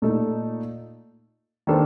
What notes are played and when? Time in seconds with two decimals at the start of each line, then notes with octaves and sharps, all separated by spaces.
0.02 A#2 A3 D#4 A4
1.67 D#3 A#3 D4 A4 C5